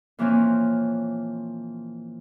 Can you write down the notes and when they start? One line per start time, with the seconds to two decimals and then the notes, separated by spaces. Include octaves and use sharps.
0.19 A#2 E3 F3 A#3 C4 C#4